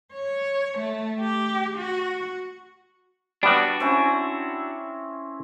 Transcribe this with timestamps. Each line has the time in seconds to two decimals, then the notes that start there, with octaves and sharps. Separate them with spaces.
0.13 C#5
0.78 A3
1.19 G4
1.78 F#4
3.43 G3 B3 D4 F#4
3.80 C4 C#4 E4